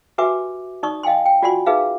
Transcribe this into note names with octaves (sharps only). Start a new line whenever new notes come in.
F#4 G4 B4 E5 G#5 D6
D#4 D5 C#6 D#6
D#5 F5 G5 G#5 C6
G5
F4 F#4 D5 F#5 G#5 C6
D#4 G#4 B4 E5 F5